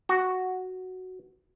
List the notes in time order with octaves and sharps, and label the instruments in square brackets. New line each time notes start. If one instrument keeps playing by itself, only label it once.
[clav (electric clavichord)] F#4